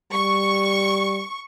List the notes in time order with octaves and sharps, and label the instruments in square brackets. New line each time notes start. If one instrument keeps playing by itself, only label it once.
[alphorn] G3 [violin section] C#6